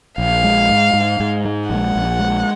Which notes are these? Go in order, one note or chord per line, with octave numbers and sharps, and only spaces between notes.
A#1 F5
G#3
G#2
G#2
G#2
G#3
A#1 F#5
A#1
G#3